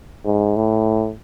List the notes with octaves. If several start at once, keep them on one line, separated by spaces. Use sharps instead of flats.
G#2
A2